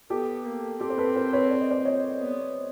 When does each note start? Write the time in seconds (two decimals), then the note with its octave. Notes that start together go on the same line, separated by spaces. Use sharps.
0.10 B3 G4 A4
0.45 A#3
0.80 C4 G4 A4
0.90 C5
0.98 A4 B4
1.16 A#4 C5
1.33 B4 C#5
1.50 D5
1.61 D#5
1.71 C5 D5
1.85 C#5 D#5
2.20 B3